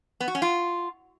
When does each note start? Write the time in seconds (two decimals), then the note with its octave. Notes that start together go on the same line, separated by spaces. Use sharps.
0.20 B3
0.28 F#4
0.35 C#4
0.42 F4